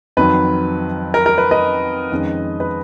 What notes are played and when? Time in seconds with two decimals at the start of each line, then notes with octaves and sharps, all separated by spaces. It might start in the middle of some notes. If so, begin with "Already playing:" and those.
0.17 F2 D#3 F#3 B4
1.14 A#4
1.26 A#4
1.38 B4
1.51 B4 D#5
2.12 F2 D#3 G#3 C#4
2.60 B4